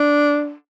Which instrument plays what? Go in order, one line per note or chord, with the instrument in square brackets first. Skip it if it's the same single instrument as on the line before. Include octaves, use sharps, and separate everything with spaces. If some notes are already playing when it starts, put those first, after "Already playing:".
Already playing: [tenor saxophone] D4